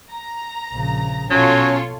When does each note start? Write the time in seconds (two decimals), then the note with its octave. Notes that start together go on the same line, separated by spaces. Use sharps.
0.11 A#5
0.72 A#1 C#3
1.31 B2 F#3 C#4 F4 A4 C#5